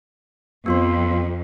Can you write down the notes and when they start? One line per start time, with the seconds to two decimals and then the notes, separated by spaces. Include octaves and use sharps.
0.66 F2 B3 F4 C6